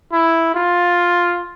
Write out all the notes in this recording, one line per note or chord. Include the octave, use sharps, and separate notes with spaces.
E4
F4